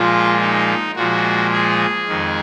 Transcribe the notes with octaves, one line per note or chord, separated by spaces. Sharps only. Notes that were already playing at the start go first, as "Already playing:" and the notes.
Already playing: A#2 F3 G#3 F4
D#4
A#2 F3 G#3 F#4
G#4
F2 D#3 G#3